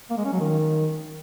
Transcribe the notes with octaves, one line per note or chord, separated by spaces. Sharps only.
A#3
G#3
C#4
F#3
D#3